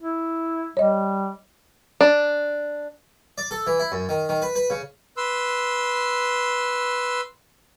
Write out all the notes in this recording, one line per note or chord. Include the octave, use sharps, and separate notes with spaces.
E4
G3 C#5 D#5
D4
D5
A4
E3
E4
F#2
D#3
D#3
B4
B4
C#3
B4 C6 E6